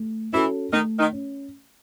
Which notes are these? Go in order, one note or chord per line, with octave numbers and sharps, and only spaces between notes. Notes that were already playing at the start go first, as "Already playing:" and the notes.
Already playing: A3
E3 C#4 E4 F#4 A4
D#3 A3 D#4
D#3 D#4
C#4